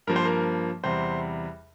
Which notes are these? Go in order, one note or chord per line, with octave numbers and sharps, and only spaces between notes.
G2 F3 A#3 A#4
C5
A#4
E2 C3 G3 C5